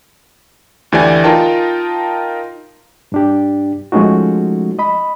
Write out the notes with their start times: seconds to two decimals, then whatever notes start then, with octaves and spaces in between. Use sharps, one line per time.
0.92 D2 E3 G4 D5 G#5
1.24 D#4 F4 A#4 G5 A5
3.12 G2 D4 G4
3.92 F3 G#3 A3 C#4 D#4 F#4
4.79 D#5 B5